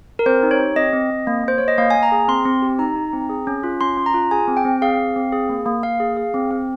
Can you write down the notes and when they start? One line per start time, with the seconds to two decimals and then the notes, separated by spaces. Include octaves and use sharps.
0.19 A#4
0.26 C4 C5
0.43 D#4
0.51 C#5
0.59 G4
0.76 C4 D#5
0.93 C4
1.10 C4
1.27 A#3
1.44 A#3 C5
1.58 A#3 C#5
1.68 D#5
1.78 A#3 F5
1.90 G#5
1.95 A#3
2.03 A#5
2.12 G#4
2.28 C4 C6
2.45 C4
2.62 G4
2.79 D#4 A#5
2.96 D#4
3.13 C4
3.29 G#4
3.47 C#4
3.64 F4
3.81 C#4 C6
3.97 C#4
4.06 A#5
4.14 F4
4.31 G#4 G#5
4.48 C4
4.57 G5
4.65 C4
4.82 G#4 F5
4.99 C4
5.16 C4
5.32 G#4
5.49 A#3
5.66 A#3
5.83 A#3 F5
6.00 G#4
6.17 G#4
6.34 C4
6.51 C4